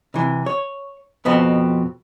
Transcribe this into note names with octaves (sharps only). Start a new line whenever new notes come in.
C3 E3
C#5
F2 B2 B3 C4